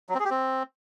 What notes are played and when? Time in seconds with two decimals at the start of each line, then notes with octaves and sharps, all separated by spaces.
0.09 F#3
0.14 C4
0.20 G#4
0.25 G4
0.30 C4